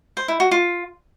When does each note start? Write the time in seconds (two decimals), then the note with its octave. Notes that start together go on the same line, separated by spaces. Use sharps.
0.17 C5
0.28 E4
0.40 F#4
0.51 F4